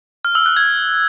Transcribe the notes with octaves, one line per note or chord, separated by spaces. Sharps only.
F6
E6
F#6
G#6